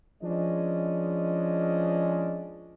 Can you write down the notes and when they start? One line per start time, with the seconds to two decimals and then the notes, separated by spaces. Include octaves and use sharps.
0.23 F3 G#3 C#4 D4 D#5